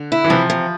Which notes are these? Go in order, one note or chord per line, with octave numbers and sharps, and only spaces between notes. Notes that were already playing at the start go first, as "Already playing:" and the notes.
Already playing: D3
E4
E3
C3 F3
C3